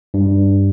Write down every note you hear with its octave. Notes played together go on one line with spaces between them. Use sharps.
G2